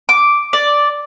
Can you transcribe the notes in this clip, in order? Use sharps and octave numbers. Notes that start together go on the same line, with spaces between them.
D6
D5